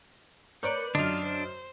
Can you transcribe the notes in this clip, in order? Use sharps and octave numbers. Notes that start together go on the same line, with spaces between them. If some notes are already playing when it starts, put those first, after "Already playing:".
A#4 B4 C#5 D5 D6 F#6 G6 C#7
F#2 D3 D4 F4 D#5 F6 C7
C5